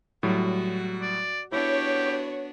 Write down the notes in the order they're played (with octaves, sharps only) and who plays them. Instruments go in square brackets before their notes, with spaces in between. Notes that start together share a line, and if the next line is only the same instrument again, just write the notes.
[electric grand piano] A2 F#3 G3 [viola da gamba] F#4
[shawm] D5
[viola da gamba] B3 D4 F#4 [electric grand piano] E4 [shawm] G4 [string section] C#5